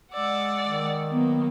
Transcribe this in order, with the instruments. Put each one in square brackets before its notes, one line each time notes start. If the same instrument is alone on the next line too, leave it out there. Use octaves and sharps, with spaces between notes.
[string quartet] G#3 D5 F#5 [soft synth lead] E6
[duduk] D#3
[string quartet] F#3 A#3 [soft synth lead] B3